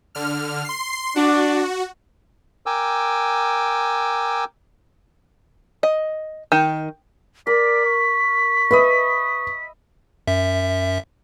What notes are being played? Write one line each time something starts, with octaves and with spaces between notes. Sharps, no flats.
D3 F6
C6 C7
D4 F#4
A#4 G5 G#5 D6 E6
D#5
D#3
A#4 D5 B6
C#6
B4 D#5 E5 B5
F#2 E5